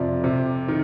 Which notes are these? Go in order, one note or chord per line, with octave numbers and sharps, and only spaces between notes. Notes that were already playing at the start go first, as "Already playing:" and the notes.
Already playing: F2 C3 F3 D5
C3
D#3